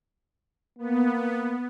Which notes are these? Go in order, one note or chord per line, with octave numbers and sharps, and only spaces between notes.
A#3 B3